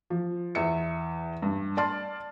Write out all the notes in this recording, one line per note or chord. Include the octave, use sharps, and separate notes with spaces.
F3
E2 E5 C#7
G2
D5 A5 C6 F6